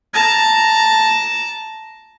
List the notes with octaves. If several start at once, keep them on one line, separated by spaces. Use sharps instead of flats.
A5 A#5